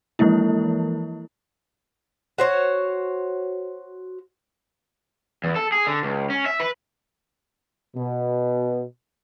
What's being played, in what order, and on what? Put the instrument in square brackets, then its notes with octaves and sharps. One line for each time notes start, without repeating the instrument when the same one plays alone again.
[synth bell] E3 F3 G#3 A#3 E4
[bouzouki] F#4 C5 C#5
[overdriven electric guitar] E2
A4
G#4
D3
C#2
C#4
E5
B4
[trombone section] B2